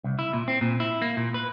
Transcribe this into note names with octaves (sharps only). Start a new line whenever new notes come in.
C2
E4
A#2
C4
A#2
E4
A#3
A#2
B4